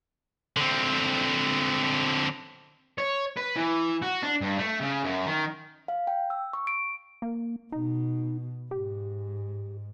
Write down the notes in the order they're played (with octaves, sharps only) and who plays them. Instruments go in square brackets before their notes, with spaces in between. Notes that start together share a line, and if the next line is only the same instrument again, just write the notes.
[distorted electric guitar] D3 C4
C#5
B4
E3
F#4
D4
G2
A3
C#3
F#2
D#3
[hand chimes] F5
G5
E6
C#6
D7
[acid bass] A#3
[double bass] B2 [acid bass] D#4
[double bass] G#2 [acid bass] G4